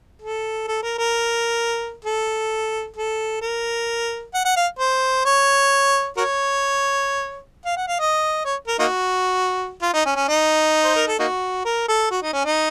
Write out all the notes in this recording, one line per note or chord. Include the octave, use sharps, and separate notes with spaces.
A4
A4
A#4
A#4
A4
A4
A#4
F#5
F#5
F5
C5
C#5
F#4 A#4 C#5
F5
F#5
F5
D#5
C#5
A#4
A#3 D#4 F#4
F4
D#4
C#4
C#4
D#4
C5
A#4
A4
A#3 D#4 F#4
A#4
A4
F#4
D#4
C#4
D#4